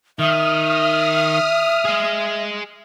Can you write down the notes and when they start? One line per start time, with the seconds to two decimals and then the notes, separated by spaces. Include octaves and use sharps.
0.19 D#3 E5 D#6 F6
1.85 G#4 D#5